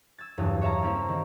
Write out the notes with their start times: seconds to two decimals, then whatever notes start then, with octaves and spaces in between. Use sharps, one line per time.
0.18 E6 G#6 A6
0.38 F#1 E2 G2 F#3 D#6
0.62 C#5 E5 F5 A5 A#5
0.82 G3 A#3 C4 C#4 E4
1.09 D#3